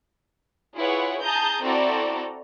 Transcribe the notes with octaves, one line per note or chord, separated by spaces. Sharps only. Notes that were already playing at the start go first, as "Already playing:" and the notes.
E4 F4 G#4 B4 C#5 F#5
G#4 A5 A#5 D#6 G6
C4 E4 F#4 A4 D5 A#5